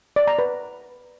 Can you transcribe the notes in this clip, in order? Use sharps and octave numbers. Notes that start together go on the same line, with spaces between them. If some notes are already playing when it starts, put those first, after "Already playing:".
D5
A#5
B4